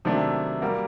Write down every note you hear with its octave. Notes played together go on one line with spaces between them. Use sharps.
C3 D#3 F#3 A3 D4
G3 A#3 F#4